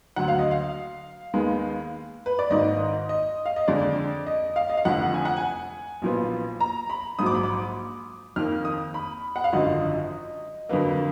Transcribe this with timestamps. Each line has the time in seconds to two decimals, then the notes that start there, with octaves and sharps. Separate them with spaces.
0.16 D2 D3 F#3 F#5
0.28 F5
0.39 D#5
0.51 F5
1.34 D#2 D#3 G#3 B3
2.26 B4
2.39 D5
2.50 G#1 G#2 D#3 D#5
3.09 D#5
3.46 F5
3.56 D#5
3.68 F2 D3 G#3 D5
4.27 D#5
4.56 F5
4.70 D#5
4.77 F5
4.85 F1 F2 D3 F3 F#5
5.14 G#5
5.25 F#5
5.37 G#5
6.02 B1 A#2 F3 B3
6.60 A#5
6.90 B5
7.19 A#1 G#2 F#3 D#6
7.26 D6
7.35 B5
7.43 D6
8.36 F2 D#3 A#3 F6
8.65 D#6
8.94 B5
9.36 F#5
9.44 F5
9.53 G#1 F#2 D3 F3 D#5
10.69 F2 D3 F#3 A#3 B4